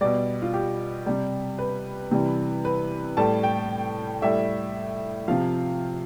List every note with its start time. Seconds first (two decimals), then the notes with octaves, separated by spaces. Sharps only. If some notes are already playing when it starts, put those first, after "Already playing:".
0.01 B2 G3 D5
0.42 F4
0.54 G4
1.06 C3 G3
1.59 B4
2.11 C3 E3 G3
2.65 B4
3.17 A2 G3 A5
3.43 G5
4.22 A2 G3 E5
5.28 C3 F3 F5